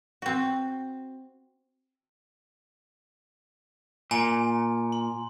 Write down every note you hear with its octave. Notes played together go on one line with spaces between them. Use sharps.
C4 F#4
A#2 G#5 A#5
C6